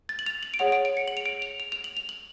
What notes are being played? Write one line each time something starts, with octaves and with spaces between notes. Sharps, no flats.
A6
F#7
F7
F#7
D7
G#4 C#5 F#5 F7
D7
D7
C#7
F#7
F7
D7
F7
F7
F7
F#7
F7
F#7